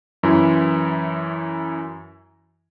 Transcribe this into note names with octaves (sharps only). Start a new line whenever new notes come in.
F#2 E3 E4